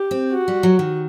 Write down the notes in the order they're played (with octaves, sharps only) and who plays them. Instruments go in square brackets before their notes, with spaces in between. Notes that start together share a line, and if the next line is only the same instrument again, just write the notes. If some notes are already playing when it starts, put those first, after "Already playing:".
Already playing: [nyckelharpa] G4
[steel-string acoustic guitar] C4
[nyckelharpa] F#4
[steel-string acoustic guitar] G3
F#3
D#3